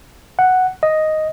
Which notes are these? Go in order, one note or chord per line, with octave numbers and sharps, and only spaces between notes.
F#5
D#5